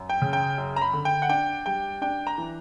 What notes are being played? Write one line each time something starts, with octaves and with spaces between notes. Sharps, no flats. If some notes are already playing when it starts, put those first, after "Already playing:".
Already playing: F#2
G5
C#3
G5
F#2
A#5
B5
D3
G5
F#5
D4 G5
G3 G5
D4 G5
A#5
E3